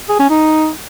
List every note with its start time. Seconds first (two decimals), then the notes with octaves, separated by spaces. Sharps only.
0.09 G#4
0.19 C#4
0.30 D#4